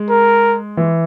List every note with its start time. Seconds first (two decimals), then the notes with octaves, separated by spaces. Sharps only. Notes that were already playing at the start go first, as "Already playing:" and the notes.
Already playing: G#3
0.10 A#4
0.77 E3